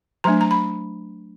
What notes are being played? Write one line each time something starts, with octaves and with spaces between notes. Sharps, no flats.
F#3 A3 D4 A#5
A#5
B5